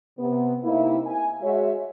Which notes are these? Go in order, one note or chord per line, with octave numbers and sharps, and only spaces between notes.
C3 B3
C3 A#3 C4 D#4 E4
G#5
G#3 F#4 C#5 E5